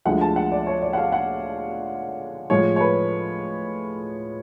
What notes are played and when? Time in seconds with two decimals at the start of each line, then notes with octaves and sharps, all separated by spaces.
0.05 D2 D3 F3 G#3 F#5
0.21 A5
0.36 F#5
0.52 D5
0.67 C#5
0.82 D5
0.93 F#5
0.98 F5
1.12 F#5
2.50 A2 F3 G#3 C#5
2.76 C#5
2.80 B4